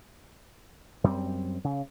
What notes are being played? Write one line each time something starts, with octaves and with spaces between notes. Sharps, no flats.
F#2 G3 A#3 C4
C#3